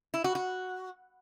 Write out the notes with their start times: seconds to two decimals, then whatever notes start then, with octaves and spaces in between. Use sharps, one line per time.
0.14 E4
0.24 F#4
0.35 F#4